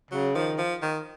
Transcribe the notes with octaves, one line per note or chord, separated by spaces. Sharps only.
C#3 F#3
D#3 F3
F3
D#3